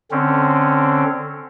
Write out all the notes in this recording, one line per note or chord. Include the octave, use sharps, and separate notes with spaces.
D3 C4 C#4